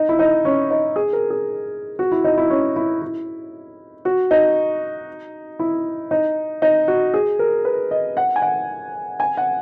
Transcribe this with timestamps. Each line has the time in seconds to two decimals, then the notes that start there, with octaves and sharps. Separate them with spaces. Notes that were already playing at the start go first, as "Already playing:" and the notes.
Already playing: D#4
0.09 E4
0.19 D#4
0.45 C#4
0.71 D#4
0.96 G#4
1.13 A#4
1.30 G#4
1.99 F#4
2.12 E4
2.24 D#4
2.38 E4
2.50 C#4
2.76 E4
3.02 E4
4.05 F#4
4.31 D#4
5.59 E4
6.11 D#4
6.62 D#4
6.88 F#4
7.14 G#4
7.39 A#4
7.65 B4
7.91 D#5
8.17 F#5
8.36 G#5
8.42 F#5
9.20 G#5
9.37 F#5